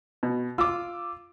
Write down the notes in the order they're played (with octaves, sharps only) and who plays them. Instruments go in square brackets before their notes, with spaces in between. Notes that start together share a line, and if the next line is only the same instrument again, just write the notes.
[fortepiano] B2
[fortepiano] F4 [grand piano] D6 E6